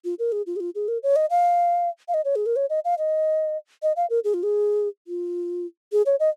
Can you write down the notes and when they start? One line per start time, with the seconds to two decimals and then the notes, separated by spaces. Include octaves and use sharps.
0.05 F4
0.19 A#4
0.32 G#4
0.46 F4
0.56 G#4
0.60 F4
0.75 G#4
0.88 A#4
1.03 C#5
1.16 D#5
1.30 F5
2.08 F5
2.14 D#5
2.25 C#5
2.36 G#4
2.46 A#4
2.56 C#5
2.70 D#5
2.85 F5
2.99 D#5
3.83 D#5
3.96 F5
4.10 A#4
4.24 G#4
4.34 F4
4.43 G#4
5.07 F4
5.92 G#4
6.06 C#5
6.20 D#5